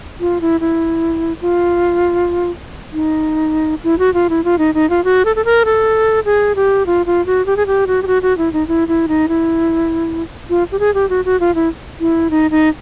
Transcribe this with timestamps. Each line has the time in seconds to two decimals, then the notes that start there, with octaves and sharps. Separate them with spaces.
0.20 F4
0.41 E4
0.60 E4
1.41 F4
2.93 D#4
3.84 E4
3.99 F#4
4.14 F4
4.30 E4
4.44 F4
4.59 D#4
4.74 D#4
4.90 F4
5.04 F#4
5.25 A4
5.36 A4
5.45 A#4
5.65 A4
6.25 G#4
6.56 G4
6.86 F4
7.06 F4
7.26 F#4
7.46 G4
7.57 G#4
7.67 G4
7.87 F#4
8.03 G4
8.07 F#4
8.22 F#4
8.38 E4
8.53 D#4
8.68 E4
8.88 E4
9.08 D#4
9.28 E4
10.50 F4
10.72 G4
10.79 G#4
10.94 G4
11.09 F#4
11.25 F#4
11.40 F4
11.55 E4
12.00 E4
12.31 D#4
12.51 D#4